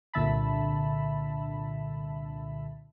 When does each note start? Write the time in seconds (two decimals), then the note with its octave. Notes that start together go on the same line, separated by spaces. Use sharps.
0.13 C2 A#2 D3 E5 A5 B5